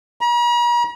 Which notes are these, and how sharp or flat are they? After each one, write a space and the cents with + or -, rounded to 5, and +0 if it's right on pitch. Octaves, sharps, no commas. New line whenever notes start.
A#5 +45